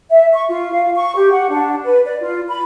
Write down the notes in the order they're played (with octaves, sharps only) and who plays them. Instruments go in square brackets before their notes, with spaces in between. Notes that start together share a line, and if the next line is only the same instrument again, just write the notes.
[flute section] E5
C#6
F4
F5
C#6
G4
F#5
D4
B4
D5
F4
B5